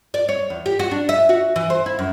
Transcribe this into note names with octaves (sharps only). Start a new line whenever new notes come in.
D5
C#5
E2
G4
F#4
D4
E5
F#4
E3
C5
E4
F#2